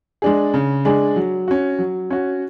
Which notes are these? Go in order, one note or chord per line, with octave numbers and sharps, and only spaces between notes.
G#3 D4 G#4
C#3
G#3 D4 G#4
F#3
C#4 F#4
F#3
C#4 F#4